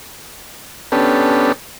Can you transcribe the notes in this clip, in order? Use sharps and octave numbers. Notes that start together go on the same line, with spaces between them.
B3 C#4 D4 G4 A4